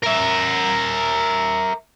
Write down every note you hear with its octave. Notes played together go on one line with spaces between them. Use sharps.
A#4 E5